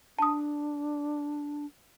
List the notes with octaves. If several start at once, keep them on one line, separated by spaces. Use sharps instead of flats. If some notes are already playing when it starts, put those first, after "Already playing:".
D4 A5 D#6